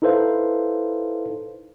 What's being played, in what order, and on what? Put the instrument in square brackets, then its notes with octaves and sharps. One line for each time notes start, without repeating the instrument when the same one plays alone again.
[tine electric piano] D#4 E4 A4 B4 C5 F5